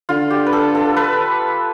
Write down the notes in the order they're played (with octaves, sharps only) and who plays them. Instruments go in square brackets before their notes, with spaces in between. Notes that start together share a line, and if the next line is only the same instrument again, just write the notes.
[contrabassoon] D3 [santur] F4
[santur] G4
B4
A4
A4
B4